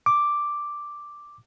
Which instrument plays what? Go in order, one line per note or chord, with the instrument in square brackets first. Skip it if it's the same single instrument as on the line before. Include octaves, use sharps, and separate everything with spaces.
[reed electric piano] D6